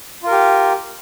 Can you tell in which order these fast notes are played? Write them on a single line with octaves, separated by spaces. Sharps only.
F4 A#4 G4